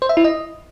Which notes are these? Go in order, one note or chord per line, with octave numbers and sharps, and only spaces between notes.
C5
E5
E4
D#5